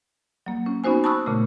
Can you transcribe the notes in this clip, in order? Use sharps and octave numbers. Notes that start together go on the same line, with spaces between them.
F#3 A#3
C#4
B3 C#4 D#4 F#4 C5 G#5
A5 B5 C#6 D#6 E6 F#6
A#2 C#3 A3